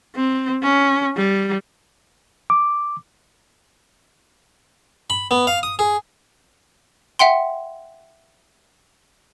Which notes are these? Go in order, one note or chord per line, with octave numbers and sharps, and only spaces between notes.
C4
C#4
G3
D6
B5
B3
F5
D#6
G#4
E5 F#5 G5 C6